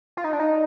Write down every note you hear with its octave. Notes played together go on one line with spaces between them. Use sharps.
F4
D#4
D4
D#4